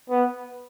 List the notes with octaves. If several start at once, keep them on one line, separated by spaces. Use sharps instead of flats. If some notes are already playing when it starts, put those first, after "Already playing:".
B3